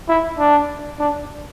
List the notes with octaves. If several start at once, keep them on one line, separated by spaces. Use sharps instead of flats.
E4
D4
D4